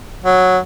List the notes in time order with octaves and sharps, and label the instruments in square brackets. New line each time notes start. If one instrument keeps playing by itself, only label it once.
[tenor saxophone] F#3